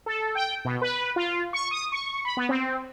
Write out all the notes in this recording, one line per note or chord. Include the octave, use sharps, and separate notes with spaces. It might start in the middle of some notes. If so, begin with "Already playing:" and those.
A4
G5
B2
B4
F4
C#6
D#6
C#6
B5
B3
C4